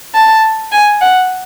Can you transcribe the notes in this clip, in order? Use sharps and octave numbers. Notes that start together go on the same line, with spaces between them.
A5
G#5
F#5